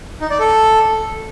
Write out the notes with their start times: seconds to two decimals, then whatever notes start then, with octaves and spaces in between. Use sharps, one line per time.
0.21 D#4
0.30 D5
0.39 A4